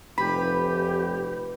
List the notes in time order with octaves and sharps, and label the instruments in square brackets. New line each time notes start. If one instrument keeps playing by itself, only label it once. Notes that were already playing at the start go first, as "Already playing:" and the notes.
[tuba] F1 [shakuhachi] G4 [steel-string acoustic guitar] B4 [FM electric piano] B5